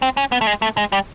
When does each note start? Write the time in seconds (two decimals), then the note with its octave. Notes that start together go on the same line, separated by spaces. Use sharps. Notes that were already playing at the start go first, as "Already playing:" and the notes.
0.02 C4
0.17 C#4
0.32 B3
0.41 A3
0.47 G#3
0.62 A3
0.77 G#3
0.92 G3